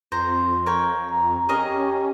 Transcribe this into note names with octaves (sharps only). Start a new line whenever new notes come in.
F2 C5 A#5
A#4 C#5 G5
A#5
C#4 G4 G#4 A#4 D#5